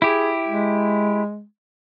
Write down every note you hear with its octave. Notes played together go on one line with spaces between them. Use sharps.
E4 G4 G#4
G#3